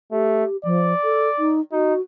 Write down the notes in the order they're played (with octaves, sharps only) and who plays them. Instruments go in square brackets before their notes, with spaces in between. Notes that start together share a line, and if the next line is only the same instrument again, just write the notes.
[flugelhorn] A3 [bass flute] G4
[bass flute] F3 [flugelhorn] D5
[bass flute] A4
D#4
[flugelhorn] D#4 [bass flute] F#4